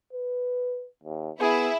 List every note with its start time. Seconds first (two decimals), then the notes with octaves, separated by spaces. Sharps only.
0.13 B4
1.04 D#2
1.40 B3 E4 G#4